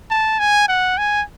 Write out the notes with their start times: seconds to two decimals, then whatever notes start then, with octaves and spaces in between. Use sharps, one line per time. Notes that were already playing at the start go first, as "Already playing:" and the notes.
0.10 A5
0.39 G#5
0.68 F#5
0.98 G#5